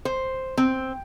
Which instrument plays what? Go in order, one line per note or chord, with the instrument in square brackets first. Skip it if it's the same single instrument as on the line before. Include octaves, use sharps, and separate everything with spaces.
[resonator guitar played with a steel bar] C5
C4